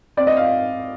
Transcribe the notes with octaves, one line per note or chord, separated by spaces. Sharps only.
C4 D5
D#5
F5